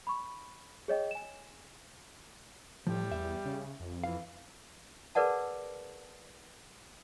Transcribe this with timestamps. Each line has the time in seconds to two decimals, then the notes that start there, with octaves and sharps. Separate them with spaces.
0.07 B5 C#6
0.88 G#4 C#5 D#5 G5
1.11 G#5 E7
2.87 A2 F3 G3
3.12 E2 E5
3.45 C#3
3.80 F2
4.04 F2 E3 F5
5.15 G#4 A#4 B4 D5 F#5 A5